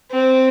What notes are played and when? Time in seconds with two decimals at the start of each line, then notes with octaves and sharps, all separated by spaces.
0.11 C4